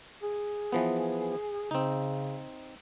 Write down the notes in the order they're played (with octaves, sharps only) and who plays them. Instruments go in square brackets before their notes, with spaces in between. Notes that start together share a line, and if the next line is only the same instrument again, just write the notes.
[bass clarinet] G#4
[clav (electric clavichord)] E3 F3 B3
[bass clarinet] C#3 [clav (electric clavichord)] C4 D#4